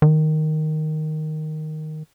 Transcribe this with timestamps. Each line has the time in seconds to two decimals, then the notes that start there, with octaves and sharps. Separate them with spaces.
0.02 D#3